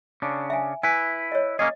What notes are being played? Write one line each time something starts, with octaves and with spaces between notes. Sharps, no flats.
C#3 D4
E5 G#5
E4 B4 G#5
C#5 D#5
A#3 C#4 G#4 D#5